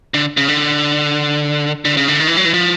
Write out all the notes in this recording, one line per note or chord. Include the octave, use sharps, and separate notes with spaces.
D3
C#3
D3
D3
C#3
D3
D#3
E3
F#3
E3
F3